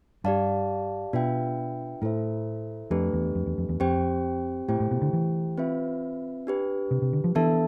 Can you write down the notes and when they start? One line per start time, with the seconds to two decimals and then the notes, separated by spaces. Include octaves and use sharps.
0.24 G2 G4 D5 F5 A5
1.13 B2 D4 F4 B4 E5 G5
2.02 A2 E4 A4 C5 E5
2.90 F2 A3 D4 G4 B4
3.13 E2
3.35 F2
3.46 E2
3.58 F2
3.69 E2
3.80 F2 C4 G4 C5 G5
4.68 A2 A3 E4 G4 C5 G5
4.80 A2
4.91 B2
5.02 D3
5.13 E3
5.58 C4 F4 B4 E5
6.47 D4 G4 B4
6.91 C3
7.02 C3
7.13 D3
7.24 F3
7.35 E3 B3 D4 A4 E5 A5